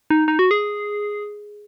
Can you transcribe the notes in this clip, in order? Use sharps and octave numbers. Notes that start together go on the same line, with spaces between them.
D#4
D#4
F#4
G#4